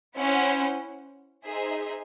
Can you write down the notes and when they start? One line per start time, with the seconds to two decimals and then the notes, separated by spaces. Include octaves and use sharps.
0.16 C#4 E4 C5 F#5
1.44 D#4 G#4 C5 E5